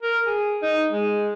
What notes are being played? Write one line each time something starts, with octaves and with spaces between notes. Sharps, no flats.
A#4
G#4
D#4
G#3